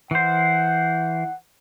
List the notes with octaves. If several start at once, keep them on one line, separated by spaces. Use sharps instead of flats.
E3 C5 F#5